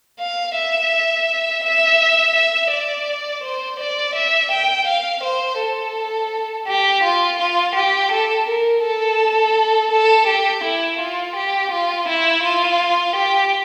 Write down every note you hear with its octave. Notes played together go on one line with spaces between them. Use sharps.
F5
E5
E5
E5
D5
C5
D5
E5
G5
F5
C5
A4
G4
F4
F4
G4
A4
A#4
A4
A4
G4
E4
F4
G4
F4
E4
F4
G4